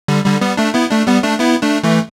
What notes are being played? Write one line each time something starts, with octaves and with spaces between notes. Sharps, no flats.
D3 G3
D3 G3
G3 B3
A3 D4
B3 E4
A3 D4
G3 B3
A3 D4
B3 E4
A3 D4
E3 A3